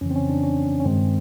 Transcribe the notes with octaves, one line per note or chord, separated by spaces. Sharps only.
F2 C#3 E3 C#4
C4
C#4
D4
C#4
C#4
G2 D#3 G#3 C4